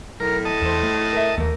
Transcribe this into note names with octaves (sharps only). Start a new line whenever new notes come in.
B1 A2 A#4
D#5 A5
E2 A4 C5
A3
A#4 E5
D#2 A3 A#4